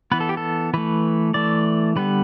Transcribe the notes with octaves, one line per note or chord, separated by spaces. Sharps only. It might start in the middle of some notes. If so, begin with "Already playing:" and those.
E3 B3 B4
A4
G4
A4
E3 A3 B4
E3 A3 D5
D3 G3 B3 B4